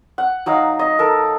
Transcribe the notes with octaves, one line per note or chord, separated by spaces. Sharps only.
F#5
F#3 D#4 F5
D#5
A4 A#4